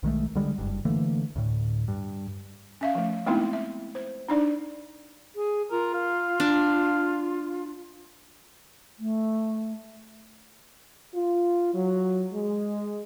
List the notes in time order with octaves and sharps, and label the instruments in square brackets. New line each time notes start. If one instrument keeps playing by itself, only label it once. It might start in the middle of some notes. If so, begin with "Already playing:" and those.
[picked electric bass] B1 D#3 G#3 A3
D3 G3 G#3
F#1 G2
D3 E3 A3 A#3
D2 A2
G2
[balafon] C#4 E5 F5
F3 A3
G#3 A3 B3 C4 D#4 E4
E5
C5
D4 D#4 D5
[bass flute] G#4
[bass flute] F4 [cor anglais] A#4
[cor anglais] F5
[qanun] D4
[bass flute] A3
[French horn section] F4
F#3
G#3